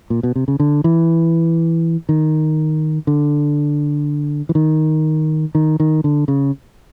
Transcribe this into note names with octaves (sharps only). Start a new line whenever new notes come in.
A#2
B2
C3
C#3
D3
E3
D#3
D3
E3
D#3
D#3
D#3
D3
C#3